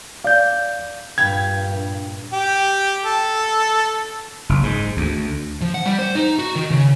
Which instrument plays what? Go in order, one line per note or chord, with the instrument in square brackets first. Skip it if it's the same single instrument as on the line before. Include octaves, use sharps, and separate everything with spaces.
[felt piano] D5 [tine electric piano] F5 G6
[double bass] G2 A#2 [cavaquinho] F5 G5 B5 [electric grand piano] G#6
[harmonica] G4
A4
[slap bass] F#1
G#2
D2
[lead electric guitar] F3
F#5
G3
C5
D#4
F#4
D#3
C#3